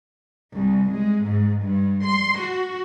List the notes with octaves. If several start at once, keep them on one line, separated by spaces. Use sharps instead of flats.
C2
G#3
G#2
G2
C6
F#4